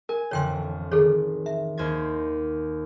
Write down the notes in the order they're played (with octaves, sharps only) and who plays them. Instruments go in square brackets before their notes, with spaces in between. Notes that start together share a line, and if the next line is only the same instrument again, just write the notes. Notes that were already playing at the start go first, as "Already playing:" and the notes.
[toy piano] A#4 [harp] G#5
[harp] A1 F2 D3 [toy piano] C#5 G5 C6
[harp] D#3 [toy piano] G#4 A4 C#5
[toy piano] E5
[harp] D#2 C5 G#6